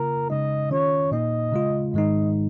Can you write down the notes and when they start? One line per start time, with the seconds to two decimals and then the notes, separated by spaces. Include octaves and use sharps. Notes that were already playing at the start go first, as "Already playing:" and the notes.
Already playing: C#3 A#3 F4 A#4
0.30 C#3 G#3 D#4 D#5
0.71 D#3 C#4 F4 C#5
1.11 A#2 A#3 D#4 D#5
1.52 C#3 G#3 F4
1.94 G#2 D#3 G#3 D#4 D#5